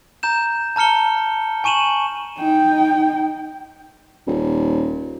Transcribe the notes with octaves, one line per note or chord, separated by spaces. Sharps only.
A#5 G6 E7
A5 A#5 F6 C#7 G7
G#5 C#6 D#7 E7 F#7
D#4 G5
D#1